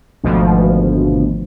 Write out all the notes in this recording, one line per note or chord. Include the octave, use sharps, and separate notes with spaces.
G#1 D2 B2 F3